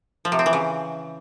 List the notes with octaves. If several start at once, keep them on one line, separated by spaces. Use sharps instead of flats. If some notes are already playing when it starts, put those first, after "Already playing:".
F3
C3
C4
E3
C#3